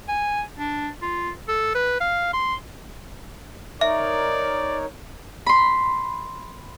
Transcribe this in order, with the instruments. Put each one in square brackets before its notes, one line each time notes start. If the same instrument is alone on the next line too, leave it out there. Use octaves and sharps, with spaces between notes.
[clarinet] G#5
D4
F4
A4
B4
F5
C6
[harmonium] D#4 A#4 C#5 [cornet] D5 [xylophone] E5
[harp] B5 C6